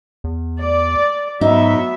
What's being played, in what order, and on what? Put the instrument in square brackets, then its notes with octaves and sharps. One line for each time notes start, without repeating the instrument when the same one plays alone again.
[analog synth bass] E2
[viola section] D5
[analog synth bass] G#2 [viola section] F#3 B3 E5 [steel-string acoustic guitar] D#4